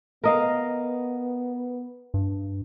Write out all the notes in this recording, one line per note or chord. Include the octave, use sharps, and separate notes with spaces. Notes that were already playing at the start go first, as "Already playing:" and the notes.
B3 A#4 D#5 F5
G2